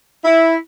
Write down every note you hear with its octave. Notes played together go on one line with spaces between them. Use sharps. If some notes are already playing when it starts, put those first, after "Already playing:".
E4